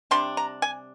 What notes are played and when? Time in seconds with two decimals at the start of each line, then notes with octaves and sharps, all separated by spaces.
0.11 C3 G3 D4 C6
0.37 A#5
0.62 G#5